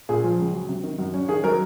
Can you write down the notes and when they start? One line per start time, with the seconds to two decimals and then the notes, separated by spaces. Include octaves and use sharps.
0.09 A#2 G#4
0.24 F3
0.39 C#2
0.53 F#3
0.69 C3
0.83 D#3
0.99 F#2
1.14 C#4
1.28 D#3 G#4
1.43 F#3 A#4